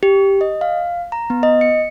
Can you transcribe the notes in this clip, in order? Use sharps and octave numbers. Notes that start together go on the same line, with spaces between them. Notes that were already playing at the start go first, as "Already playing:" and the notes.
G4
D#5
F5
A#5
B3
D#5
C#7